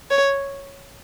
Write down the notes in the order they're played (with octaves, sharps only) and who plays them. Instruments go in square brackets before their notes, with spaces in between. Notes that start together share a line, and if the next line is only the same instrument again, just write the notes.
[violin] C#5